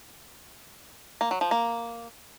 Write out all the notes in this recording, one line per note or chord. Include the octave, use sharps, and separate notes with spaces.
A#3
F#3
F3
A#3